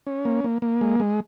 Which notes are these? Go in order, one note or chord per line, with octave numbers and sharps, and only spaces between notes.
C#4
A#3
A#3
A#3
G#3
G#3